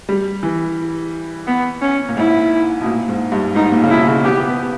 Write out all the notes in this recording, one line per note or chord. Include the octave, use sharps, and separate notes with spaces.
G3
E3
B3
C#4
A#2
G#2 E4
B2
A#2
G#2
G2
G#2 D#4
A#2
C#3
B2 E4
C#3
B3 G4
B3